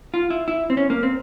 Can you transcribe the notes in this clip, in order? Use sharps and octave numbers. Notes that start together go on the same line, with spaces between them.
F4
E4
E4
C4
C#4
A#3
C4